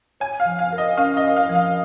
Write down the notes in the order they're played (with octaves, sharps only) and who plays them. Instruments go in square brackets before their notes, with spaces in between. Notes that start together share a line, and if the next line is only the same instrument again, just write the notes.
[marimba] C#5 [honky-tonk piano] G#5
[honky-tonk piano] F5
[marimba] F3
[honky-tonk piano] F5
[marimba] A#4
[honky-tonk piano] D#5
[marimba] C#4 [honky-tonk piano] F5
[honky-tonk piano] D#5
[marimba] A#4
[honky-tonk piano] F5
[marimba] F3
[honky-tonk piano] F5